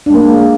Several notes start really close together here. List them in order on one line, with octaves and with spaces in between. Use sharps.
D4 G#3 A#3